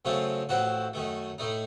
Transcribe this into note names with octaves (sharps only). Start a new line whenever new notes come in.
F#2 C#3 A3 C4 F4
A1 A2 F3 C4 F#4
F#2 D#3 A3
A2 A3 D#4